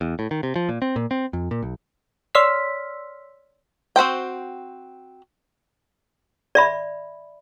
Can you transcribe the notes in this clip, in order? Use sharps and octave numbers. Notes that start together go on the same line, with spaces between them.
E2
A2
D#3
C3
F3
A#2
C4
A#2
C4
F2
A#2
B1
C#5 D5 C6 E6 F6 B6
C4 F#4 C5 G5
D5 E5 B5